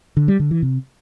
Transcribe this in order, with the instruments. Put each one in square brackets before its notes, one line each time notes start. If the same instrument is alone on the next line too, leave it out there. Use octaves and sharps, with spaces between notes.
[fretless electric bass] D3
G3
D3
E3
C3